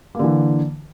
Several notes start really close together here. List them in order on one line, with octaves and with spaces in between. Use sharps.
A#3 D3 E3